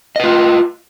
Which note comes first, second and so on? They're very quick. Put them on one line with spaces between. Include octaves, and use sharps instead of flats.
D#5 B4 F4